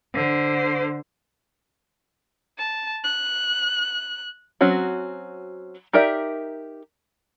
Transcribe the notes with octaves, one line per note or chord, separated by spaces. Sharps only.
D3 C5
A5
F#6
F#3 C4 C#4 F#4
D#4 G4 A#4 D5 E5